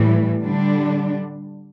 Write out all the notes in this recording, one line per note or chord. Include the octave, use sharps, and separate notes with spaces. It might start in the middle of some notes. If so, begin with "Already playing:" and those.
Already playing: A2 E3 G3
D3 G3 D4